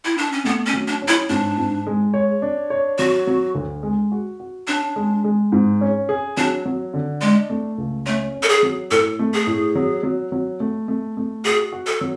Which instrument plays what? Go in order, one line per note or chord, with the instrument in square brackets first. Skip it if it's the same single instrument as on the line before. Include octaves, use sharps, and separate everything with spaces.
[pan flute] E4
D4
C#4
[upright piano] A3 [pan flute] B3
[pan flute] C#4
[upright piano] F#3
[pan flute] D4
[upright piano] C#4
[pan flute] E4
[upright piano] G#2 [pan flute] D4
[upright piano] G#2
G#3
C#5
D4
C#5
[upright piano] F#3 [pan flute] F#4
[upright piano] F#3
D2
G#3
F#4
F#4
[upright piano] C#4 [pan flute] D4
[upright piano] G#3
G#3
G#2
C#4
G#4
[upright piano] F#3 [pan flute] D4
[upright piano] F#3
D3
[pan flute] G#3 [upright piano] D4
[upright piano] A3
C#2
[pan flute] A3 [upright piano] C#4
[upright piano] C#4
[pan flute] A4
G#4
[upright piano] F#3
[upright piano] A2 [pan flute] A4
[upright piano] A3
[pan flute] G#4
[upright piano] A2
F#3
F#3
F#3
A3
A3
A3
[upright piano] F#4 [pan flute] G#4
[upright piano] F#4
[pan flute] A4
[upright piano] F#3